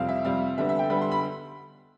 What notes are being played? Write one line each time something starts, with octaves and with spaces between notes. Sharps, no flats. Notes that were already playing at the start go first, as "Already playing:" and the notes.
Already playing: F2 C3 G3 C4 F5
E5
F2 C3 G3 C4 F5
D3 G3 B3 E5
E5
G5
D3 G3 B3 B5
C6
B5